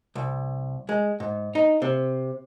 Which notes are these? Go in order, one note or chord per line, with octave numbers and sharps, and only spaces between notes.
C2
G#3
G#2
D#4
C3